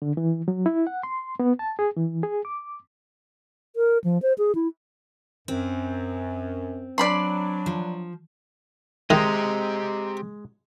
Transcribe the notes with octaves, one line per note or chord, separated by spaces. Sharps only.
D3
E3
F#3
E4
F#5
C6
B3
A5
G#4
E3
G#4
D6
A#4
F3
C5
G#4
E4
F#2 C4
F#3 D4 D5 B5 C6
F3
D#3 G#3 G4 C5 D#5 A#5